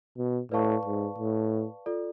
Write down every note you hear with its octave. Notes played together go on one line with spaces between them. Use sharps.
B2
A2 B4 D5 F5 A5 C#6
G#2
A2
F4 A4 D5